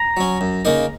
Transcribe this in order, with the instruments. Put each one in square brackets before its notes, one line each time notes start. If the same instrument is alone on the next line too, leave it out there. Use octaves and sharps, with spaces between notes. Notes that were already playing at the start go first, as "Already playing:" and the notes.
Already playing: [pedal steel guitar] A#5
[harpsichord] F#3 C#4
F#2
C#3 A#3 D#4 A#4